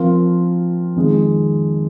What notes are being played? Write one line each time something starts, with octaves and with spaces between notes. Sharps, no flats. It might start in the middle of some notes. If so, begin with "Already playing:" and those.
Already playing: F3 C4 F4 A#4
F2 D#3 G#3